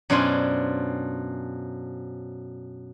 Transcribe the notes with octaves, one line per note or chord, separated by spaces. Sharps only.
F#2 B2 D4 F4 C5 G#5